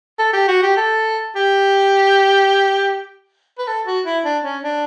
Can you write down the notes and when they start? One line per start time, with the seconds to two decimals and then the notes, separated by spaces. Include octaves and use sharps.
0.19 A4
0.33 G4
0.48 F#4
0.63 G4
0.77 A4
1.36 G4
3.58 B4
3.67 A4
3.87 F#4
4.06 E4
4.25 D4
4.44 C#4
4.64 D4